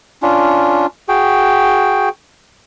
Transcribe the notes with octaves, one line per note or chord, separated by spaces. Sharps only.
C#4 D4 F4
F#4 G#4 G5